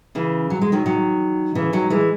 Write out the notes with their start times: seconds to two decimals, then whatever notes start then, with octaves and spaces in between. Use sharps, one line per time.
0.15 C#3 E3
0.50 F#3
0.61 G#3
0.72 D#3 F#3
0.86 D#3 F#3
1.55 C#3 E3
1.73 D#3 F#3
1.90 E3 G#3